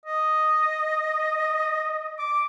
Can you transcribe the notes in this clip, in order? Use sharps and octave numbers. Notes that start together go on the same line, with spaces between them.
D#5
D6